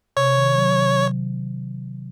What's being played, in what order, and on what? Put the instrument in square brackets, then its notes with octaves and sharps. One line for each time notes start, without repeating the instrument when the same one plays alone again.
[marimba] C3 [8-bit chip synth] C#5
[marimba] D#3
F#3
C3
F#3